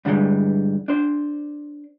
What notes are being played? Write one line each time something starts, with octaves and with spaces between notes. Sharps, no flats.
G2 D3 E3 F3 G3 G#3
D4 C5